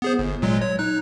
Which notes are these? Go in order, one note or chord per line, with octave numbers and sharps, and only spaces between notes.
B3 G#4 C5
G1
A#2 F#3 G#3
C#5
D#4 F#6